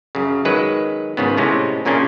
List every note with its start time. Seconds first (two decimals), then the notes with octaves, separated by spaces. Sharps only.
0.15 F#2 C#3
0.45 D#3 F#3 G#3 B4
1.17 G#1 G#2 C#3 B3
1.37 A2 C3 G#3 C#4
1.85 F#2 A#2 C#3 A#3 C#4 D4